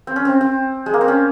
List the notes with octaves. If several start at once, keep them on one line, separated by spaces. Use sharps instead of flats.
C4
C#4
C4
C4
G#3
A#3
C4
C#4